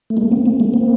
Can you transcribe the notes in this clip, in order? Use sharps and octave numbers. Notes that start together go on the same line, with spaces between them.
A3
G#3 A#3
A#3 C4
A#3 C4
G#3 A#3
A#3 C4